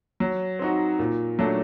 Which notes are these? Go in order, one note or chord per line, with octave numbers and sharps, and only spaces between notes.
F#3
C4 D#4 F#4
A#2
F#3 A3 D4